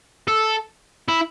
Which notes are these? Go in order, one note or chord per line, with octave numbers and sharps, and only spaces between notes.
A4
E4